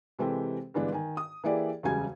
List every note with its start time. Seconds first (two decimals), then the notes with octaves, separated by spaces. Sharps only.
0.19 C3 E3 G#3 C4 G4 A4
0.74 G2 D3 E3 G#3 B3 D4
0.92 D#3 G#5
1.17 D#6
1.44 E3 A#3 E4 G4 G#4 D5
1.83 E1 F#2 C#3 G3 G#5 G#6